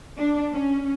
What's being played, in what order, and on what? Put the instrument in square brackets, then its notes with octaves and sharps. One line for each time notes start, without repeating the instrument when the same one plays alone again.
[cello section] D4
C#4